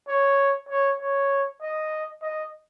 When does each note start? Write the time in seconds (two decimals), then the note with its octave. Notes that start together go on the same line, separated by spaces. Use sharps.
0.08 C#5
0.69 C#5
1.00 C#5
1.61 D#5
2.22 D#5